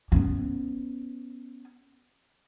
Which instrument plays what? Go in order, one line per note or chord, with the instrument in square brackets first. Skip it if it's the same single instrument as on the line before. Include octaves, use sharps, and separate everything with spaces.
[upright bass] B3 C#4